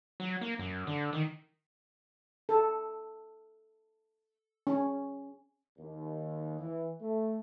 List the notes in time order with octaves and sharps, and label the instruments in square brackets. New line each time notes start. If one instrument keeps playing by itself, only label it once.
[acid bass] F#3
A#3
F#2
D3
D#3
[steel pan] A4
C#4
[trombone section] D#2
E3
A3